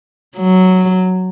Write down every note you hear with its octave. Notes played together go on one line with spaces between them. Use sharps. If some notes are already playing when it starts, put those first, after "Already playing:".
F#3